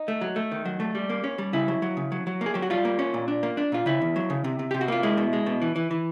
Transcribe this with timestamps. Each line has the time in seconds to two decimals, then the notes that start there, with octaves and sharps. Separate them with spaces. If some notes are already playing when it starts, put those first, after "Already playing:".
Already playing: D#4
0.08 A3
0.21 F#3
0.36 A3
0.52 D#3
0.65 F#3
0.80 A3
0.95 G3
1.10 A#3
1.24 C#4
1.38 G3
1.53 C#3 E4
1.68 F#3
1.82 F#3
1.97 C#3
2.12 F#3
2.27 F#3
2.41 A#3
2.46 G#4
2.54 F#3 G4
2.62 F#4
2.70 G3 F4
2.85 A#3
2.99 C#4
3.14 A#2
3.28 D4
3.43 A#3
3.57 D4
3.72 A#2 F4
3.86 C#3 E4
4.01 E2
4.16 F#3
4.30 C#3
4.44 C3
4.59 C3
4.71 C3 G4
4.81 F#4
4.88 A#3 F4
5.03 G#3 E4
5.17 B2
5.33 G#3
5.46 B2
5.62 E3
5.76 E3
5.91 E3